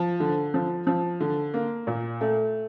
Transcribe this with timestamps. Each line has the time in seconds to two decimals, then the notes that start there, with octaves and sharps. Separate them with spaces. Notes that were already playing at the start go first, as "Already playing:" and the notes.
Already playing: F3
0.20 D3
0.54 F3
0.87 F3
1.20 D3
1.54 A#3
1.87 A#2
2.21 A3